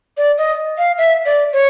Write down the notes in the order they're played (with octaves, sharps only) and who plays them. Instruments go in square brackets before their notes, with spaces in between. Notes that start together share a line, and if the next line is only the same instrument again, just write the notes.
[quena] D5
D#5
F5
E5
D5
C#5